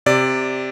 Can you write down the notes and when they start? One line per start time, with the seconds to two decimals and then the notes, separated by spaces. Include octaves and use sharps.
0.06 C3 D5